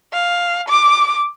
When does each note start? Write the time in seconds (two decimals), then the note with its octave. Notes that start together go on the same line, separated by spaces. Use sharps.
0.13 F5
0.68 D6